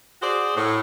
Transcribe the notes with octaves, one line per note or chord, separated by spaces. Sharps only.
F#4 G#4 C5 D5
A2